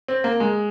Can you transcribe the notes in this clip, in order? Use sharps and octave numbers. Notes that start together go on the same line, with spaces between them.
C4
A#3
G#3